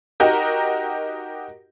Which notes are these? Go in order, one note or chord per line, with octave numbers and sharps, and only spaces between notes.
D#4 F#4 G4 A#4